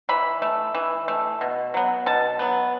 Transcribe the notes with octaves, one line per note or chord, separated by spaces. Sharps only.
E3 B5
A3
E3
A3
B2
F#3 B3
B2 A5
F#3 B3